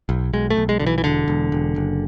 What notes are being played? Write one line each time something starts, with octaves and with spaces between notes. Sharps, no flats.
B1
B1 G#3
A3
B1
G#3
B1 D3
E3
E3
E1 D3
E1
E1
F#1